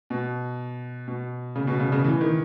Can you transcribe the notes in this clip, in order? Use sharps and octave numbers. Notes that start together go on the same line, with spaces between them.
B2
B2
C#3
B2
C#3
C#3
E3
D#3